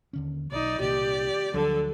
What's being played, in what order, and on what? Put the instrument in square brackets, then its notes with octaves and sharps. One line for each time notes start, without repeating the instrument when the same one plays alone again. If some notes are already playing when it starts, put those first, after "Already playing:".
[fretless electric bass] D#2 D3 C#4
[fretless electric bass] B1 [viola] D#4 D5
[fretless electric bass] C2 A#2 D#3 [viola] G4 D5
[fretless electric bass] D2 F3 F#3 [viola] D3 A4